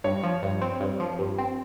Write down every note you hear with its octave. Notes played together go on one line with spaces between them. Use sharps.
G2 C#5
F3
G2
C4
G2
F3
G2
C4